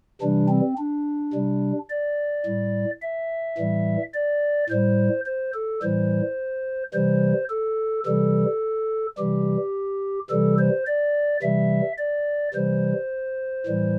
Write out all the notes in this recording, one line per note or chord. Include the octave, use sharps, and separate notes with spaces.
C3 E3 G3 D4
C4
D4
C3 G3
D5
A2 G3
E5
A2 E3 G3
D5
A2 G3 C5
C5
A4
A2 E3 G3 C5
C3 E3 G3 C5
A4
C3 E3 G3 A4
C3 E3 G3 G4
C3 E3 G3 A4
C5
D5
C3 E3 G3 E5
D5
C3 E3 G3 C5
A2 E3 G3